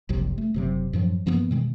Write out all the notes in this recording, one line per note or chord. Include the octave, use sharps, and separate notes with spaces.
F#1 C2 C3 F3
A3
F#1 C3 F#3
F#2 A2 F3 F#3
G2 F3 A#3 B3
B2 D#3 G#3